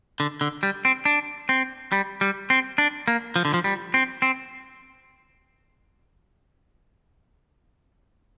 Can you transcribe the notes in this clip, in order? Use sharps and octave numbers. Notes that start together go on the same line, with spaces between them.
D3
D3
G3
C4
D4
C4
G3
G3
C4
D4
A#3
F3
D3
F3
G3
C4
C4